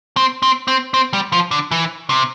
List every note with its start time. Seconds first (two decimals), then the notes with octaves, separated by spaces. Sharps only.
0.17 C4
0.43 C4
0.68 C4
0.94 C4
1.13 G3
1.32 F3
1.51 D3
1.71 E3
2.10 C3